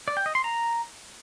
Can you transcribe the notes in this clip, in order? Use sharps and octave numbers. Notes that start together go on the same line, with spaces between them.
D5
G5
D#5
C6
A#5